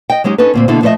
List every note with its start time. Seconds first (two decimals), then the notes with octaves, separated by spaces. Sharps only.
0.10 D#5 G5
0.24 F#3 G#3 C#4 D#4 G4
0.38 C#4 D#4 A4 B4
0.54 D2 A#2 C4
0.68 B2 D3 A#3 E4 A4
0.82 F3 A3 B4 C#5 D#5 E5